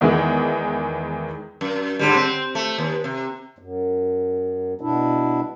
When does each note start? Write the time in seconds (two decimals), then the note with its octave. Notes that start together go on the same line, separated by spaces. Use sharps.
0.01 E2 D#3 E3 G#3
1.61 F#2
1.99 G#2 D3 G3
2.15 C4
2.55 A3
2.78 D#2
3.04 C3
3.59 F#2
4.81 B2 D4 E4